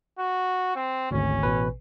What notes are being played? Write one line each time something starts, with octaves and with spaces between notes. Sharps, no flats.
F#4
C4
G#1 D2 C#4
A1 B2 B4